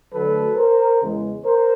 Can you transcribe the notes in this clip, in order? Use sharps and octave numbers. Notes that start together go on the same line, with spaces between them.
D2 D3 F#3 A3 A4 B4
A#4 C5
E2 C#3 E3 G#3 B3
A#4 C5